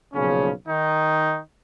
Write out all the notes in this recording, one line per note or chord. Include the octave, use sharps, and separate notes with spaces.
B1 A#2 C#3 F3 C#4
D#3 D#4